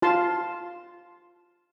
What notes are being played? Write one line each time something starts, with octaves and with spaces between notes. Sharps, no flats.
F4 F5 A5 C6